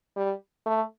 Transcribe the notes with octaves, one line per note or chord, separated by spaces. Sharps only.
G3
A3